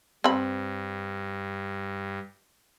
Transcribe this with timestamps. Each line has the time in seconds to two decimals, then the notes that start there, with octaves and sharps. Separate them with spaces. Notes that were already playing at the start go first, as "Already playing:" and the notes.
0.24 G2 C4 B5